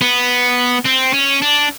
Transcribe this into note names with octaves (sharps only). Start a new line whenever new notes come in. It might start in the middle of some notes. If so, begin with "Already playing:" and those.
B3
C4
C#4
D4